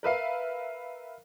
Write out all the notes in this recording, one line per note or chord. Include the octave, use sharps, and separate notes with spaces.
A#4 B4 E5 F5